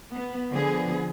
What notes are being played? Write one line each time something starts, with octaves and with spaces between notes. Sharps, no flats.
B3
D3 F3 B3 G#4